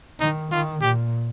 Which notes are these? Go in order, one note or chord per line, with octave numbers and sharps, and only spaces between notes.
D#3 D#4
D#3 F4
A#2 G4